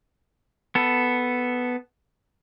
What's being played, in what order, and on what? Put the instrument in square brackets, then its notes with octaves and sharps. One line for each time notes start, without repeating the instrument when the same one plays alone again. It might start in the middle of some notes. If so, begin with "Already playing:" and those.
[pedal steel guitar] B3 A4